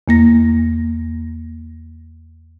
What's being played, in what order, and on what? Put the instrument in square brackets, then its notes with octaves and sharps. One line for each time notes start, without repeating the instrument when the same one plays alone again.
[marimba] E2 A#3 A#6